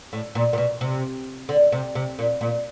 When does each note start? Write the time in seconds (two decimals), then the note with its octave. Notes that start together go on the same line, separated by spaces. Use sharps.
0.13 A2
0.35 A#2
0.53 A#2
0.58 B2
0.81 C3
1.49 D3
1.72 C3
1.95 C3
2.19 A#2
2.41 A#2